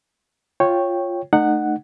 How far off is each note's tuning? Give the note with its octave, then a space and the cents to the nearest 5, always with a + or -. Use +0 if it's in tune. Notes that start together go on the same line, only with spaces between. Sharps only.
F4 +0 C#5 -10 G5 +0
A3 +0 D#4 -30 F#5 +0